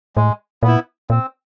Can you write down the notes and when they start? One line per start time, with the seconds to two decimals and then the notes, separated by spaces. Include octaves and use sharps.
0.16 A2 G#3
0.63 A#2 B3 E4
1.10 A#2 C4